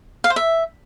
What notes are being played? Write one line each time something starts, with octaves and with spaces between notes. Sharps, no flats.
F5
C5
E5